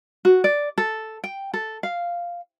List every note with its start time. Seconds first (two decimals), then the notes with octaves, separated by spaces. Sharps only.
0.25 F#4
0.44 D5
0.78 A4
1.24 G5
1.54 A4
1.83 F5